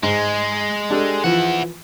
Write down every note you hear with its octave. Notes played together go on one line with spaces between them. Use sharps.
G#2 G#3
D4 G4 A4
E3 F3 E4 F#5